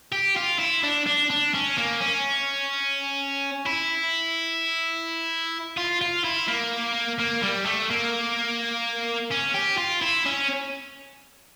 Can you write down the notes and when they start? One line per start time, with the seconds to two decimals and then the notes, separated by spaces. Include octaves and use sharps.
0.13 G4
0.37 F4
0.59 E4
0.84 D4
1.06 D4
1.30 D4
1.54 C#4
1.78 A#3
2.01 C#4
3.66 E4
5.77 F4
6.01 F4
6.24 E4
6.48 A#3
7.19 A#3
7.42 G3
7.66 A3
7.90 A#3
9.32 C#4
9.54 G4
9.77 F4
10.01 E4
10.26 C#4